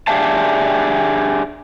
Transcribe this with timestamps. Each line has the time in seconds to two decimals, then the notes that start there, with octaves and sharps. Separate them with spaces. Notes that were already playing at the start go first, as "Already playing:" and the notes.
0.07 D4 G4 G#4 E5 F5 A5